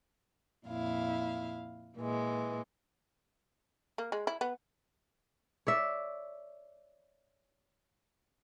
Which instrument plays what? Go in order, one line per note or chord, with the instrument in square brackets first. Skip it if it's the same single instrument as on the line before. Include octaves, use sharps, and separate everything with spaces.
[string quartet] F2 A#2 E4 F5
A#2 E3 G#3
[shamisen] A#3
G#3
E4
B3
[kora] C#5 D5 E5